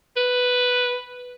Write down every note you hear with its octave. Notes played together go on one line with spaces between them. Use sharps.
B4